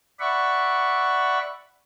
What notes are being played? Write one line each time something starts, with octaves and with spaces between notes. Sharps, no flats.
D5 E5 F#5 B5 C#6